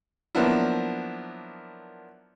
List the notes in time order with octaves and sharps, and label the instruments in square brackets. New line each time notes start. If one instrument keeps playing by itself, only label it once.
[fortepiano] F3 F#3 A#3 B3 D4 E4